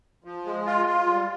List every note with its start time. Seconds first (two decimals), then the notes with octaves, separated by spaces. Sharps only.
0.24 F3
0.45 G#3
0.66 F4
0.86 F4
1.07 G3